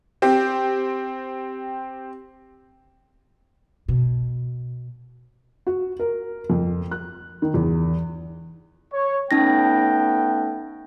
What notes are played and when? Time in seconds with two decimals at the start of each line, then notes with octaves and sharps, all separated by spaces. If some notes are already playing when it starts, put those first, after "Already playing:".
0.22 C4 G4
3.88 B2
5.67 F#4
5.99 A#4
6.50 F2
6.91 F#6
7.42 D#3
7.54 E2
8.93 C#5
9.31 A3 B3 C#4 D#4 G5 A#6